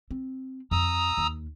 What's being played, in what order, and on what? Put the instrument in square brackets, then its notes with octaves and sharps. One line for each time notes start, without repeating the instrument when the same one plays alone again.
[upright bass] C4
[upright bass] F2 [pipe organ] A#5 D#6 E6
[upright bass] D#2